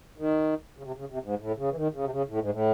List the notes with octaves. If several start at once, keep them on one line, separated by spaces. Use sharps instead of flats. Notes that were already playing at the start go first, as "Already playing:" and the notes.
D#3
C#3
C3
C#3
C3
G#2
A2
C#3
E3
D#3
C#3
C3
C#3
A2
G#2
A2